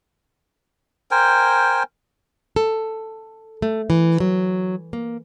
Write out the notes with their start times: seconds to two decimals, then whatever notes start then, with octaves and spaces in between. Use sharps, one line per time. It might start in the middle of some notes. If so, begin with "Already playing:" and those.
1.11 A#4 C5 G5 G#5
2.56 A4
3.62 A3
3.90 E3
4.20 F#3
4.93 A#3